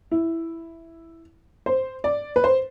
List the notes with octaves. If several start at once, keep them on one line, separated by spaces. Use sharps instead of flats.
E4
C5
D5
B4
C5